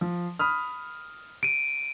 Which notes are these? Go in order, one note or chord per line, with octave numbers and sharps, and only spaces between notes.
F3
B5 D#6 F6
D7 D#7